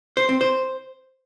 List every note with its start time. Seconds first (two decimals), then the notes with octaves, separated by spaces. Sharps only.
0.17 C5
0.29 C4
0.41 C5